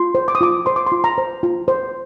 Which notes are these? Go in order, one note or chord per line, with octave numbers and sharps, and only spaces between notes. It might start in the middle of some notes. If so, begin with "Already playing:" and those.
Already playing: F4 C6
C5
D6
D#6
F4 D6
C5 C6
D6
C6
F4
A#5
C5
F4
C5